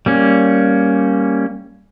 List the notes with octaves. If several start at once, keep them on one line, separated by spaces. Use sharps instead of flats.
G3 A#3 C#4